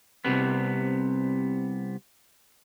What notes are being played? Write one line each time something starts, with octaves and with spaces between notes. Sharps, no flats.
C2 F#2 C3 B3